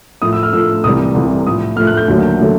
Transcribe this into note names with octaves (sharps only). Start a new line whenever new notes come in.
A2 F3 A3 D#6
E6
F6
A2 F3 A3 E6
C2 C3 E3 G3 D#6
C2 C3 E3 G3
A2 F3 A3 D#6
A2 F3 A3 F6
F#6
G6
D#2 D3 F#3 A3
D3 F#3 A3